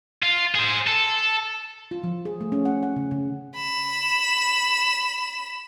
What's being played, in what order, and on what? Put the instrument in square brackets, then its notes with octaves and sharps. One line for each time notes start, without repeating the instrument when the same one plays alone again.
[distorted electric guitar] F4
G#4 C5
A4
[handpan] F4
F3
G#4
A3
C#4
F#5
F#5
C#3
C#3
[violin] B5 E7